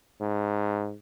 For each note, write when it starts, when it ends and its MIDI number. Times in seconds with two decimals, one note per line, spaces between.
0.21 0.95 44